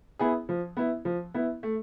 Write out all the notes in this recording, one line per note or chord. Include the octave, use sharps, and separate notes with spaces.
B3 E4 G#4
F3
B3 E4
F3
B3 E4
A3